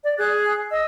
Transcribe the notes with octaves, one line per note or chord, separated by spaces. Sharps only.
D5
G#4 F#6
D#5 E6